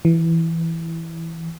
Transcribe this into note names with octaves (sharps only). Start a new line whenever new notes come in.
E3